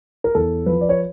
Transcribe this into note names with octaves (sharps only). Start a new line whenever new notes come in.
A#4
E2 A4
F3 B4
D5
C#5